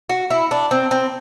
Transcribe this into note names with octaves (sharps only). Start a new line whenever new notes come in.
F#4
E4
D4
C4
C4